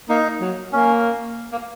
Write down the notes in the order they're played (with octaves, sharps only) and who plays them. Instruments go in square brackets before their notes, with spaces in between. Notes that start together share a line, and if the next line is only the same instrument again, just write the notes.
[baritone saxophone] A#3 [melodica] D#4
[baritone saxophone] F#3
[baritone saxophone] A#3 [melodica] C#4
[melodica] A#3